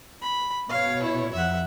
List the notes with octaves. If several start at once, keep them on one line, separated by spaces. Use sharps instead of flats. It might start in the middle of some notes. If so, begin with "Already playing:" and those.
B5
B2 C#5 F5
E4
F2 E5 F#5